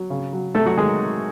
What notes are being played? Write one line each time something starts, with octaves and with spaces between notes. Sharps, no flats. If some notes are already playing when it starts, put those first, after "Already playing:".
Already playing: F#3
C#3
F#3
C3 A3 A4
F#3 F#4
D#3 G#3 G#4